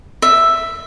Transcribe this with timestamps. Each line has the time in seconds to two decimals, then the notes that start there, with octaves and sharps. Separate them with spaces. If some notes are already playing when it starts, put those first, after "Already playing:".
0.22 E5